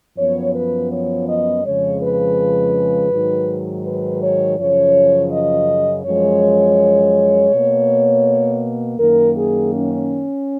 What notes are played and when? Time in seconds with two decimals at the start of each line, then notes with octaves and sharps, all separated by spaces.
0.17 F#2 F3 B3 C#5
0.54 B4
0.91 C#5
1.27 D#5
1.64 F2 C#3 F3 G#3 C#5
2.01 B4
3.12 G#2 D#3 F#3
3.85 B4
4.21 C#5
4.58 F#2 C#3 F3 C#5
5.31 D#5
6.05 F#2 F3 G#3 C#5
7.52 B2 A#3
8.98 F#2 D#3 A#3 A#4
9.36 G#4
9.72 C#4